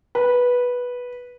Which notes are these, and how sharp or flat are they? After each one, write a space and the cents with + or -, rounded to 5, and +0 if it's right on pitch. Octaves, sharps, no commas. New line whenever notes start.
B4 -10